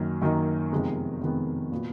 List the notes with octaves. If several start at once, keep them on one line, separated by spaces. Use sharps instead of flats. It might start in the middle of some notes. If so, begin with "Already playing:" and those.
Already playing: F#2 D#3 F#3 A#3 D#4
F#2 D#3 F#3 A#3 D#4
F2 C3 D#3 G#3 B3
F2 C3 D#3 G#3 B3
A#2 F#3 B3